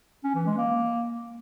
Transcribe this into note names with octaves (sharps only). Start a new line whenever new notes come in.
C#4
E3
G#3
A#3